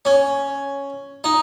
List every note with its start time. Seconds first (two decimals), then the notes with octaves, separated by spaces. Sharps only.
0.05 C#4
1.24 D#4